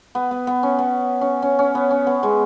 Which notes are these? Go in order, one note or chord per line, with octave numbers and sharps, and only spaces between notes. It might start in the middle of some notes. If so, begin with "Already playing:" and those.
B3
B3
B3
C#4
B3
C#4
C#4
C#4
B3
C#4
B3
G#3